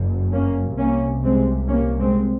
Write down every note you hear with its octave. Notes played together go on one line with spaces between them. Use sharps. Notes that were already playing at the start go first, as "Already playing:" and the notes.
Already playing: F#1 F#2
A#3 C#4
C2 C3 A#3 C#4
G#3 C4
A#3 C#4
G#3 C4